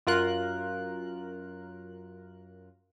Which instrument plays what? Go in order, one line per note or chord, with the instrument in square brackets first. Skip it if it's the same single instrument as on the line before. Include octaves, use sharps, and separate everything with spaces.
[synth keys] F#2 F4 A#4 F#6